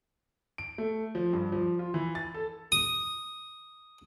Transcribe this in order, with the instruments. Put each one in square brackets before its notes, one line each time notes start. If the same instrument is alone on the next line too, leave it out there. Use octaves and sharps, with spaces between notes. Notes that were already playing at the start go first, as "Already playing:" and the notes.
[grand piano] D7
A3
F3
G2
F3
F4
E3
A6
A4
[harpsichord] D#6